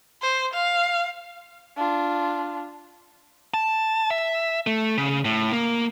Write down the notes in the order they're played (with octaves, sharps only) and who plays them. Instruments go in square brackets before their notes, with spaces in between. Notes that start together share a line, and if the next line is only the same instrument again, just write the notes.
[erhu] C5
F5
[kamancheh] D4 F4
[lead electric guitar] A5
E5
A3
C#3
A2
A#3